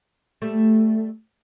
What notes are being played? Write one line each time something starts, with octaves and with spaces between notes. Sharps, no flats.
G3 A3